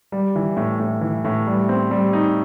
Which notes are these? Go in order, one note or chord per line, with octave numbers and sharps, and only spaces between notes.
G3
E3
A2
A2
E3
A2
G3
C4
G3
D#4